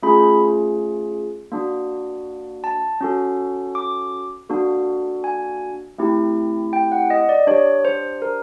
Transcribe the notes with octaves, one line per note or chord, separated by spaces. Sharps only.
A3 C#4 F4 G#4 B5
A#3 D4 F#4
A5
C#4 F#4 A4
D6
A#3 D4 F#4 A4
G#5
A3 C4 E4 G4
G5
F#5
D#5
D5
D4 G4 C#5
C5
A#4